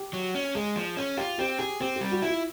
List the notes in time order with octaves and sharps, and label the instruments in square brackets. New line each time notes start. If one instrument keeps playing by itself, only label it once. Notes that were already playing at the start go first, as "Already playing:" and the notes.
Already playing: [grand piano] G4
[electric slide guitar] F#3
C#4
[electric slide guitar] G#3 [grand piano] G#4
[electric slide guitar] F3
C#4
[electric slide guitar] F4 [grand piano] G4
[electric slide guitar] C4 [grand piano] G4
[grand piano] G4 [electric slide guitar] G#4
[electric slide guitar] C4 [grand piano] G4
[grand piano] G4
[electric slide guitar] G3
[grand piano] F#4
[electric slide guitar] E4 [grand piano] F4